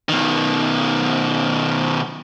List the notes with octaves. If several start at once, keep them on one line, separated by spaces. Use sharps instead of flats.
B2 D#3